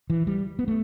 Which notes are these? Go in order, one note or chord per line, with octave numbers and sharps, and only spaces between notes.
E3
G3
B3
A3